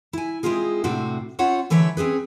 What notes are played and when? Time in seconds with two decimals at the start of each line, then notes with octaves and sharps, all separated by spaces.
0.13 E4 G#5
0.43 G#3 C4 E4 F4 G#4
0.84 A2 C3 C4 D4 F#4
1.39 C#4 F4 C5 C#5 E5 F#5
1.70 D3 E3 E4 B4 C#5 E5
1.97 C4 C#4 G#4 B4